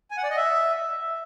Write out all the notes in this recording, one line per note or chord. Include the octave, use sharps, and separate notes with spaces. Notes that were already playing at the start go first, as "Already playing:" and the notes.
G#5
F#5
D5
D#5
E5